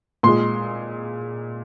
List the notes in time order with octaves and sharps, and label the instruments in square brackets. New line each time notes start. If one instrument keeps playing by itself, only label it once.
[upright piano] A#2 G#3 C6